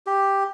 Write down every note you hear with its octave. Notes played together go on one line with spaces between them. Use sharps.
G4